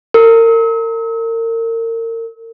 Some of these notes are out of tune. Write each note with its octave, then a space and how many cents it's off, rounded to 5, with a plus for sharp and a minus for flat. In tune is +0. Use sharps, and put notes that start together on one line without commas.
A#4 -35